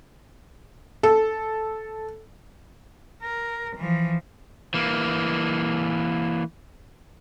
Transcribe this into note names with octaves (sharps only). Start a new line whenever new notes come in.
A4
A#4
E3 F3
E3 A#3